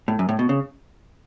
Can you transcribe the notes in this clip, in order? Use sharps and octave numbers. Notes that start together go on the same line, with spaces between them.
A2
F#2
A2
B2
C#3